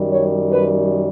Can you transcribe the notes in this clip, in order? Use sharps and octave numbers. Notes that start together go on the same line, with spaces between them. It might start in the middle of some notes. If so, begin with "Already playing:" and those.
Already playing: F#2 D#3 G3
C#5
B4